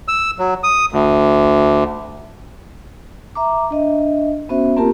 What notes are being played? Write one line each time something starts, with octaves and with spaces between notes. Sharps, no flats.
E6
F#3
D#6
D2
E5 A#5 D6
D4 D#5 E5
B3 C#4 F#4 C5 E5
A#3 C4 F4 G4 A#4 A5